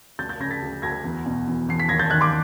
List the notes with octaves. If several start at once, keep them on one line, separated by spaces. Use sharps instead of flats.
D2 G6 A6
G6 A6
C#3 G#6 A#6
A6 B6
D2
D2 G#6 A#6
E2
B2
E2
E2 C7
B6
D#2 G#6 A#6
G6 A6
D#3 F#6 G#6
C6 D6